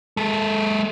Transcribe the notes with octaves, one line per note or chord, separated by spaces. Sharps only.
G#3 A4